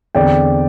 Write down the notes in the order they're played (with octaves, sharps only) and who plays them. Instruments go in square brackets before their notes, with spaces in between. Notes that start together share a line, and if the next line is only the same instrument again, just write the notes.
[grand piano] E2 D3 C4 D5 G5